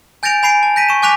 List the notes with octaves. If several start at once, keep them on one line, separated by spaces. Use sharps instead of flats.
G#5 G6 A6 A#6 D7 F7
G#5 B5 C7 D7 F7
A5
G6 A#6 B6 D#7
C#6 E7
G#5 D6 F#6 B6 F7